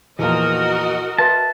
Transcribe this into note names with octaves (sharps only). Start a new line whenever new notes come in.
E2 A#2 F3 F#4 A#4 D#5
B4 E5 A5 C6